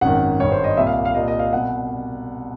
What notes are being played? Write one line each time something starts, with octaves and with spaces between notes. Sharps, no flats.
G#1 F#2 D#3 F#5
G#1 G2 D#3 C#5
C5
D#5
C2 A#2 E5
F5
F5
C2 A#2 D#5
D#5
F5
C2 B2 F#5